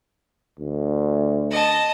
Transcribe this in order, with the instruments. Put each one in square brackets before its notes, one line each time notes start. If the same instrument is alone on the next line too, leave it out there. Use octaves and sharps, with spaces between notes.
[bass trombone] D2
[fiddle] D#5 A5